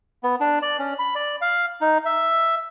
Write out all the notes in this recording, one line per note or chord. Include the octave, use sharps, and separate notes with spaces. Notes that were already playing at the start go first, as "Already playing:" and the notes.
B3
D4
D5
C#4
B5
D5
F5
D#4
E5